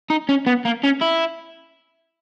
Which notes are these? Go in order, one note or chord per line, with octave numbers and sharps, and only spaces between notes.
D#4
C#4
B3
A#3
C#4
E4